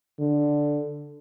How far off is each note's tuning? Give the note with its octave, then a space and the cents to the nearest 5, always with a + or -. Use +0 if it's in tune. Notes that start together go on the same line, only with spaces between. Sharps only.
D3 +0